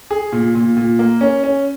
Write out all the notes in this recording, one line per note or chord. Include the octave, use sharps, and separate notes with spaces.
G#4
A#2
A#2
A#2
A#3
C#4
C#4